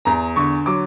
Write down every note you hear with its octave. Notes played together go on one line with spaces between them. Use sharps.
E2 A#5
D3 C#6
F#3 D6